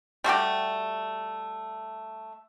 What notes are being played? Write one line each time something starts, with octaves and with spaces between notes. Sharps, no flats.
G3 A3 F#4 G4